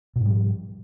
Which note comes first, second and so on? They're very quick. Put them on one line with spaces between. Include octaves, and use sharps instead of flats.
B2 G#2 G3 F3